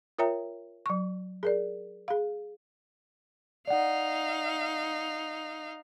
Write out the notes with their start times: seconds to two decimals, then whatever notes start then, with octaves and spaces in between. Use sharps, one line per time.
0.19 F4 A#4 C#5 E5 G5 A#5
0.86 F#3 C#6
1.43 G#4 A#4 D5
2.08 G#4 F5
3.67 D#4 D5 F5 F#5